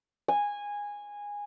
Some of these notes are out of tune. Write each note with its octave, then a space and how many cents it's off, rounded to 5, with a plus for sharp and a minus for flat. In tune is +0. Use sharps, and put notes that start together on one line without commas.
G#5 -15